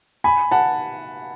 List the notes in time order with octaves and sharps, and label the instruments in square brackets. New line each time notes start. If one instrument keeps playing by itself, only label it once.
[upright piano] G#5 B5
F#5 A5